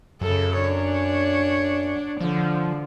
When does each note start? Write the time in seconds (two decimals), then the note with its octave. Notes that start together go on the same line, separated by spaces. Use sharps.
0.21 F#2 C#3 A4
0.61 D4 C#5
2.21 D3 F3